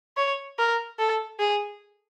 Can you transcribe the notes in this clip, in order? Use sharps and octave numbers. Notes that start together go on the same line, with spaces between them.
C#5
A#4
A4
G#4